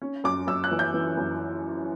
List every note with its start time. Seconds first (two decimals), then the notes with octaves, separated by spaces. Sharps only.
0.02 C#4
0.24 F#2 D6
0.47 F#2 E6
0.64 F#6
0.71 E3
0.79 G6
0.94 E3
1.17 F#2